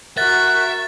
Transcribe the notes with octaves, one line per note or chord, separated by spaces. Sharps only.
F#4 A#4 E5 F#5 A6